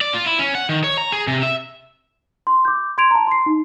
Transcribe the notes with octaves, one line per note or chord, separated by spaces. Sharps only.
D5
F4
E4
C#4
F#5
D#3
C#5
A#5
G#4
C3
E5
C6
D6 G6
C6 G#6 D7 F7
A5 A#5
C6 C7
D#4